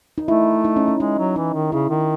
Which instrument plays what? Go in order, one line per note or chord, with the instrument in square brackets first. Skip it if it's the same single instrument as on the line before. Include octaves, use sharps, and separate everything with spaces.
[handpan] D#4
[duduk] A3 [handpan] E4
[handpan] D#4
C#4
C#4
[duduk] G#3 [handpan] D#4
[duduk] F#3
[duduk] E3 [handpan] D#4
[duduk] D#3
[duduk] C#3 [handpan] E4
[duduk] D#3